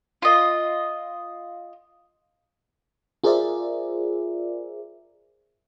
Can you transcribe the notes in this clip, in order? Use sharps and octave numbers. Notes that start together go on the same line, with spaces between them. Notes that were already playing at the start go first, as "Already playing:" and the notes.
F4 D#5
F4 G#4 A#4 C5 D5 E5